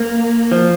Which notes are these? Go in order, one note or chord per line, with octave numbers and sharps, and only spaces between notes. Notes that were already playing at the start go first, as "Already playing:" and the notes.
Already playing: A#3
F3